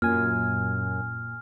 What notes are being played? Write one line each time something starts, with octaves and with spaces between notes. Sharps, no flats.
F#2 A#2 G#5 F6